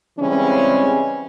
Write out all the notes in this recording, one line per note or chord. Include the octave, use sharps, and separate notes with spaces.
C#3 E3 G3 G#3 C4 C#4